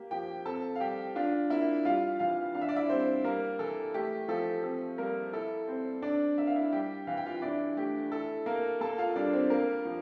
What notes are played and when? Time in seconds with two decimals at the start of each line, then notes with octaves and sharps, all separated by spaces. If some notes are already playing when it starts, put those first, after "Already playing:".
Already playing: A#3 G4
0.11 F3 G4 G5
0.45 C4 A4 A5
0.75 F5
0.80 G3 G4 G5
1.16 D4 F4 F5
1.50 A#3 E4 E5
1.85 G3 F4 F5
2.19 E3 F4 F5
2.54 D4 F5
2.61 E5
2.69 D5
2.76 E4 E5
2.89 G3 C4 C5
3.24 G3 A#3 A#4
3.59 E3 A4
3.94 A3 G4
4.28 F3 A4
4.64 C4 A4
4.98 G3 A#3 A#4
5.33 E4 A4
5.68 C4 C5
6.02 D4 D5
6.38 A#3 E5
6.47 F5
6.56 E4 E5
6.72 G3 G4 G5
7.07 E3 F5
7.17 G5
7.26 F4 F5
7.42 D4 E4 D5
7.77 A3 G4
8.12 E4 A4
8.46 A#3 A#4
8.81 A#3 A4 A5
8.98 F4 F5
9.16 G3 D4 D5
9.33 C4 C5
9.50 A#3 A#4
9.85 F3